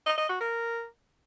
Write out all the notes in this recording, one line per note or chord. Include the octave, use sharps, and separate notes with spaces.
D#5
D#5
F#4
A#4